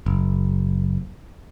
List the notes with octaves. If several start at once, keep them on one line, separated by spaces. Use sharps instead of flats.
F#1